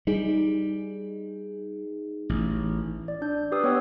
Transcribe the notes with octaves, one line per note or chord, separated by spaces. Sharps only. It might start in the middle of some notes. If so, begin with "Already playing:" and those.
G3 D#4 G#4
A1
D5
D4 G6
D4 G4 B4 D#6 E6
B3 C#5 G5